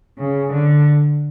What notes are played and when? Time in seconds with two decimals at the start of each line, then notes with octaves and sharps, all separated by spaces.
0.18 C#3
0.53 D3